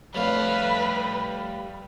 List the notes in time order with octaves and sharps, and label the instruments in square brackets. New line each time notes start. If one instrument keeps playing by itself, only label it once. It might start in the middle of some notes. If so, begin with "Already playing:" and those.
[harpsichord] F2 A2 D3 [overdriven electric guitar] G3 F5 [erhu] B4